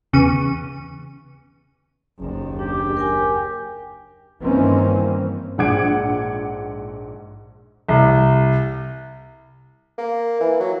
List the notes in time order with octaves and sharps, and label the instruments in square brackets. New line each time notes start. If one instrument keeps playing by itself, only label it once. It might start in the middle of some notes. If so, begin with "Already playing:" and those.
[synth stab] E2 C#3 C#6 D#7
[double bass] F#1 D#2
[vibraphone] D4 [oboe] G4
[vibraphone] A#4 G5 G#5
[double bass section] G2 D#3 E3 A#3 C4 C#4
[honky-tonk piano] A#1 G#2 F#5 D6 G#6 D7
[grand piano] C2
[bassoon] A#3
E3
F#3